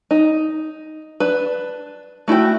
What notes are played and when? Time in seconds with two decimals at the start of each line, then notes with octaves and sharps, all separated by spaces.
0.11 D#4
1.20 D4 B4
2.28 A3 E4 F#4 G5